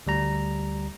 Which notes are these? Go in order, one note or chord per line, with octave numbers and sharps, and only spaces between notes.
D2 G3 A#5